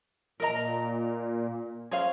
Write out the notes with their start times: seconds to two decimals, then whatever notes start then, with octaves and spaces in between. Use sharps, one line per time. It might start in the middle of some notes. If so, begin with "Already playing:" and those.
0.40 A#2 A#4 D#5 A#5
1.91 C#4 G#4 C5 F5